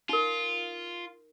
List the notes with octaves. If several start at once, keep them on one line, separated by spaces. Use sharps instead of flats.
D#4 F4 A#4